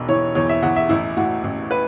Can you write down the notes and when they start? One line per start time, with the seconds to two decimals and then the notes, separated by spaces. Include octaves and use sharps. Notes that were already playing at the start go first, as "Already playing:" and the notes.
Already playing: E1 B1
0.09 E3 C#5
0.35 E2 C#5
0.49 E5
0.63 E2 F#5
0.76 E5
0.89 A1 E4
1.17 A2 F#4
1.44 A1
1.71 B4